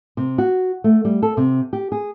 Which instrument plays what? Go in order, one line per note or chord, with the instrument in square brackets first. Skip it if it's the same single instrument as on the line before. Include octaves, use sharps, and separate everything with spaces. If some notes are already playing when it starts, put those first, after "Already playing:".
[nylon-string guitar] C3
F#4
A3
G3
A4
C3
G4
G#4